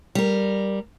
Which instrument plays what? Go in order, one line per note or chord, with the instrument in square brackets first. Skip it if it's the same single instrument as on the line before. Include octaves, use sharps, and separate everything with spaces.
[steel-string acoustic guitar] G3 A#4